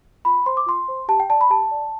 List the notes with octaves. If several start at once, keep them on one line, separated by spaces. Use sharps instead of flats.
F4 B5
C5 C6
D6
F4 C6
C5
G4 A5
G5
D5 A5
B5
G4 A5
D5